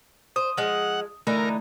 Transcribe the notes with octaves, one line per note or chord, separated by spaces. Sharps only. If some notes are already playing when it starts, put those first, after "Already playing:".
C5 D#6
F3 G#3 F#5
D3 E3 A3 D#4 A#4